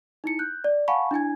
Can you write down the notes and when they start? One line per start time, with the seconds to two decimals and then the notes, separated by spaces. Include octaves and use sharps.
0.24 D#4 E4 C#7
0.39 F#6 G6
0.64 D5
0.88 F5 F#5 G#5 A5 B5 C#6
1.11 D4 E4 G#5 G#6